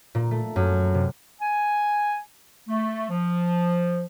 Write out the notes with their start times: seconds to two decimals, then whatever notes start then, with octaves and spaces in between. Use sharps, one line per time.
0.15 A#2
0.31 A3
0.56 F#2
0.94 C3
1.41 G#5
2.68 A3
3.09 F3